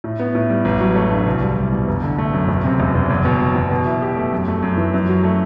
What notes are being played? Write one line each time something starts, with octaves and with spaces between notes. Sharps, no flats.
A2
B3
A2
G3
A1
F#3
A3
G2
C2
G3
C2
B2
G1
D3
A3
F#2
E1
C3
E1
E2
F#1
B2
F#3
E2
B2
E4
G4
A3
F#2
A3
F#2
E3
F#2
F#3
A3